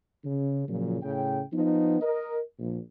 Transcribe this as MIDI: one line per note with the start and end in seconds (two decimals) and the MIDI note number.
0.24 0.62 49
0.68 0.96 46
0.68 0.96 49
0.68 0.96 53
0.68 0.96 54
1.02 1.41 45
1.02 1.41 49
1.02 1.41 79
1.53 2.00 53
1.53 2.00 59
1.53 2.00 63
2.01 2.38 70
2.01 2.38 75
2.59 2.78 34